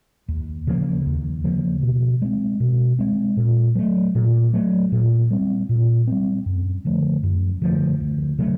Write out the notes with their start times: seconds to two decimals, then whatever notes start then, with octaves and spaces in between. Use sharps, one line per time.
0.28 D#2
0.67 C#3 F3 A#3
1.06 D#2
1.44 C#3 F3 A#3
1.82 B2
2.22 G#3 C4
2.60 B2
2.99 G#3 C4
3.37 A#2
3.75 F#3 A3
4.15 A#2
4.53 F#3 A3
4.92 A#2
5.31 G3 C4
5.69 A#2
6.07 G3 C4
6.46 F#2
6.85 D3 F3 A3
7.23 F#2
7.62 D3 F3 A3
8.00 D2
8.39 C#3 F#3 A3